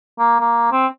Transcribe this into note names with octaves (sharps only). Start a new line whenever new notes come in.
A#3
A#3
C4